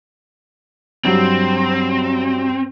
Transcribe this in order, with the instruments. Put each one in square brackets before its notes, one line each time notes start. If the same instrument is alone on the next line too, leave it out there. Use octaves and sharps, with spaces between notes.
[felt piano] G2 F#3 [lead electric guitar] C4